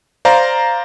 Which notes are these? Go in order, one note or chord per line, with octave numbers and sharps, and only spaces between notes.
C5 D5 F5 A#5